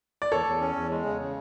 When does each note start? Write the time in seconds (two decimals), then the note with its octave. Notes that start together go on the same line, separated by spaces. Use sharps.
0.22 D5
0.32 E2 A4 C#5
0.46 E2
0.61 C#4
0.76 E2
0.91 G#3
1.05 C#3
1.20 C#3